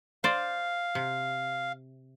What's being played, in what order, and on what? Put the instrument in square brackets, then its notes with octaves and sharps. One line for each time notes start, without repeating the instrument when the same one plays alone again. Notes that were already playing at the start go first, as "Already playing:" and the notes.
[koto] C5 D5 [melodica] F5
[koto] C3